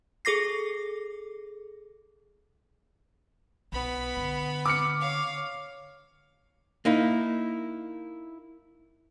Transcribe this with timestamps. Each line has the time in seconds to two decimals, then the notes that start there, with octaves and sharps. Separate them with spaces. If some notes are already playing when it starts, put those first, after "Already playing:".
0.25 G#4 A4 D6 A#6 C7
3.72 B1 B3 B5
4.17 D3
4.66 D6 F6 C#7
5.01 C#5 F5
6.85 A#3 D#4 E4